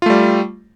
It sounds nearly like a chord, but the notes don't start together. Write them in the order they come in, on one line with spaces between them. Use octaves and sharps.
F4 A3 G3